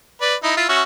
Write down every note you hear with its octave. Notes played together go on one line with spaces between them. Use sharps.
B4 D5
D#4 E4
E4 F4 E5
C#4 F#4 E5